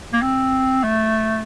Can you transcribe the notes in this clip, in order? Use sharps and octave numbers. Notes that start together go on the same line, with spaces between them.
A#3
C4
A3